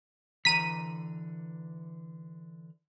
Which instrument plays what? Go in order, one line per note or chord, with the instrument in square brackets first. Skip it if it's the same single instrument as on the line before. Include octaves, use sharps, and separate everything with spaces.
[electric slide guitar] D3 E3 A#5 [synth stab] B6 D#7